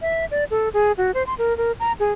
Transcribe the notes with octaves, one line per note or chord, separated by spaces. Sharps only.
E5
D5
A4
G#4
F#4
C5
C6
A#4
A#4
A#5
G#4